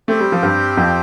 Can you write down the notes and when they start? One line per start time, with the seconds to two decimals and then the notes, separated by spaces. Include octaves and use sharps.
0.08 A3 C4 G4 C5 G5
0.20 G3
0.32 F3
0.43 G2 G3
0.77 F2 F3